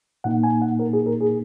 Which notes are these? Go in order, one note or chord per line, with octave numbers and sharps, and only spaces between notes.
A#2 A#3 D#4 F#5
G#5
F#5
A#4
G#4
A#4
G#4